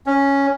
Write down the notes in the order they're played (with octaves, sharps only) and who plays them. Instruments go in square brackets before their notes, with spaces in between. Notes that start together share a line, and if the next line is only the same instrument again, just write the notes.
[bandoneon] C#4